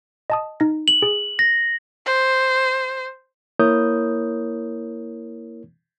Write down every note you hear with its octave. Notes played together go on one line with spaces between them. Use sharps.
D#5 A5 D#6
D#4 A#6
F#7
G#4
A#6
C5
A#3 E4 A#4 C#5 D#6 G6